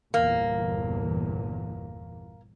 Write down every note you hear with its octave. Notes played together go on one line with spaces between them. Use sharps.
G1 E2 A#2 A#3